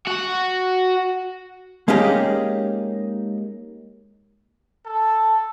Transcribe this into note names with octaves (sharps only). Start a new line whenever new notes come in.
F#4
G#3 A#3 C#4 D#4 G4 G#4
A4